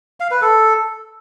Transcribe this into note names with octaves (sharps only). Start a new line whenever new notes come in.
F5
B4
A4